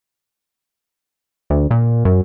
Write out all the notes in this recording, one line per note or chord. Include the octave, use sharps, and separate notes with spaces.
D2
A#2
F#2